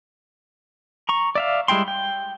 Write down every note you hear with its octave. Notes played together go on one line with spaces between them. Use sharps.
A#5 C#6
D5 E5 F5
G3 G#3 E4 G5 C6
G5